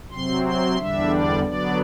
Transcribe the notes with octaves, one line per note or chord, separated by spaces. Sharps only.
C3 F#3 C4 C6
C6
E2 D3 G3 D4 E5
D5
D3 F#3 B3 D4 D5